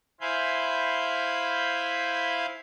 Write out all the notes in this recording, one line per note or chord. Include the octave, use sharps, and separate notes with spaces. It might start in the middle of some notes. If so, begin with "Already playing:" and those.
E4 C5 F5 G#5 B5 G6